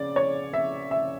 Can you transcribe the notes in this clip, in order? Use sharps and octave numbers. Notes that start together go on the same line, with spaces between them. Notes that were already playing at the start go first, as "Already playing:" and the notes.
Already playing: C#3 D5
C#5
E5
E5